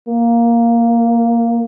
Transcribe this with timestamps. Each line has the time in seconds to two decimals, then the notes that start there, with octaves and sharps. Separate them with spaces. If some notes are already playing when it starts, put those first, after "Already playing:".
0.08 A#3